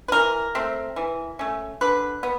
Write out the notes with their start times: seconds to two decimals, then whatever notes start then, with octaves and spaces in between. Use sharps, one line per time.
0.08 B4
0.12 E3 A#4
0.55 A3 C4
0.96 E3
1.39 A3 C#4
1.81 D3 B4
2.23 B3